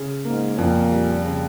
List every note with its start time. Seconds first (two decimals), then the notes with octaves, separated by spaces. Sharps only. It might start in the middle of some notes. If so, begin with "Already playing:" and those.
Already playing: C#3
0.25 G#2 A#3
0.58 F2 A#2
0.91 G3
1.25 C#3